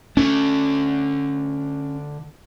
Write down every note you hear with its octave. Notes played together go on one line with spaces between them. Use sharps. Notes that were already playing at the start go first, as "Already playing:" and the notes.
D3 A3 C#4